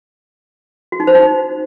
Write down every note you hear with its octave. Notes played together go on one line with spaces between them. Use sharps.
F#4
D#4
C5
D#4